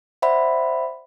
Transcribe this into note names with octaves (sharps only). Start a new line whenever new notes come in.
C5 D5 E5 F#5 B5